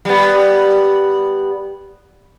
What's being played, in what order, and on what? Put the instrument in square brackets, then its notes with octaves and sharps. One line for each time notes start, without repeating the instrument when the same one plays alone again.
[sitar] G3 B3